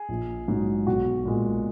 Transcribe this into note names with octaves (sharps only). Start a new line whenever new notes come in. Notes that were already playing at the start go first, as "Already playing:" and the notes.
Already playing: G#4
A#1
G#2 F#3
B1 F#4
A#2 G#3